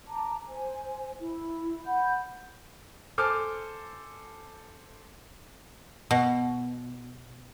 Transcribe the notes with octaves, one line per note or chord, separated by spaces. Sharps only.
A5 A#5 D6
C5 G#5
E4
F#5 B5 G6
A4 C5 G#5 D6 F6
B2